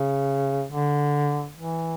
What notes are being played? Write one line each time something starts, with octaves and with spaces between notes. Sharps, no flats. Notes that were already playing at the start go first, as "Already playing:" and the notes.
Already playing: C#3
D3
E3